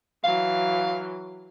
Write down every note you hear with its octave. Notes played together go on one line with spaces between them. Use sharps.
E3 F#3 F5